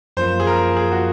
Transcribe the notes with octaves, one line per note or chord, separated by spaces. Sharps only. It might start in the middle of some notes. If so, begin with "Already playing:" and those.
F#2 F3 A#3 C5
G#4
A#4
G#4
F#4